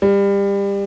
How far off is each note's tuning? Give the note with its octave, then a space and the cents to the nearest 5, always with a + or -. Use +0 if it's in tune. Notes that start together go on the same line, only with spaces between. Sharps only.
G3 +25